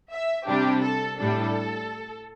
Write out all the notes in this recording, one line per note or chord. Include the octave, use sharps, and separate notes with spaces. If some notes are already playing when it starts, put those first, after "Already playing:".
E5
C3 G3 D4 G4
A4
A2 G3 D4 A4